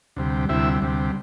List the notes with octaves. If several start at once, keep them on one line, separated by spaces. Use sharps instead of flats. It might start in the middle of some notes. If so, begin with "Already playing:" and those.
D2 C3 G3
D2 C3 G3 E4 E5
D2 C3 G3